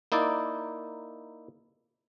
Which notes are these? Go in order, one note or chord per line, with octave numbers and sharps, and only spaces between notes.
A#3 D#4 E4 D5